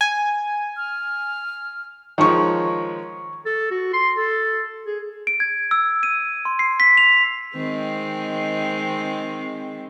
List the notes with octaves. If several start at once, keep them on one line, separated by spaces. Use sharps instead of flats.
G#5
F6
D#3 F3 G#3 C#5 C#6
A4
F#4
C6
A4
G#4
D7
G#6
E6
D#7
C6
C7
B6
F7
D#3 G#3 C4